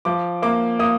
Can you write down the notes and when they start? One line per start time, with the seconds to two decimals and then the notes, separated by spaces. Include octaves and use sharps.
0.05 F3 D6
0.42 A#3 D6
0.79 A#3 D#6